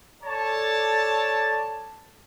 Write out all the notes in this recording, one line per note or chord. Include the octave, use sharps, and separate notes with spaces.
A4 C#5 D5 A5